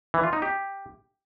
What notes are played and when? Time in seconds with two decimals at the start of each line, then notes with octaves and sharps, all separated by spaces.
0.14 E3
0.23 F4
0.33 D#4
0.42 G4